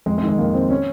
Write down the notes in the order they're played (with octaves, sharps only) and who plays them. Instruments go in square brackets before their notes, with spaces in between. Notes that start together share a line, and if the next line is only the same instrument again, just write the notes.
[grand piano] F2 G#3
G#3
D#3
G#3
F2 A#3
D#3 C4
C#4